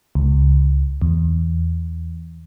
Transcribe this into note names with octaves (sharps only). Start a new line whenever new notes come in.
C#2
E2